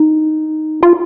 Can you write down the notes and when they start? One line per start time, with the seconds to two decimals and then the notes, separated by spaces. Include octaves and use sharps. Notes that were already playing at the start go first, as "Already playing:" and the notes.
Already playing: D#4
0.83 F4